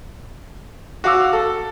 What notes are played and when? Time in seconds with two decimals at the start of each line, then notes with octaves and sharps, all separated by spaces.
1.04 F#4 F5 D6 E6
1.33 A4